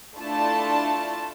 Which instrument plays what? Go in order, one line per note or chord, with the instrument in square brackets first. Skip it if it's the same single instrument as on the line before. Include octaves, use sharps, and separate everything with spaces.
[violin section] A3 D4 E4 F4 A5